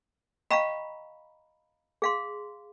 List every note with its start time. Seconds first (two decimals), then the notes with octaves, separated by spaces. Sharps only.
0.51 D#5 F5 G5 A#5 B5 C#6
2.02 G#4 F5 C6